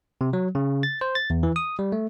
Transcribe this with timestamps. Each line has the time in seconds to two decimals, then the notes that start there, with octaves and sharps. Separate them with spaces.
0.21 C3
0.33 F#3
0.55 C#3
0.83 A6
1.01 C5
1.15 A6
1.30 E2
1.43 E3
1.56 D#6
1.79 G3
1.92 A3